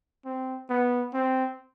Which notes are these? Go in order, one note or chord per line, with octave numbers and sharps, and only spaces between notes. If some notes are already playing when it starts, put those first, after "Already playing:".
C4
B3
C4